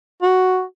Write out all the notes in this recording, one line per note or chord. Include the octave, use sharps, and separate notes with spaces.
F#4